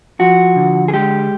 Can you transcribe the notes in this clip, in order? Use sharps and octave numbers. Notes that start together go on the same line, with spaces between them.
F3 F#4
D3
G#4
G#3 G4